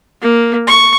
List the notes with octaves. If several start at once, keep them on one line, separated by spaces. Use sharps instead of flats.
A#3
C#6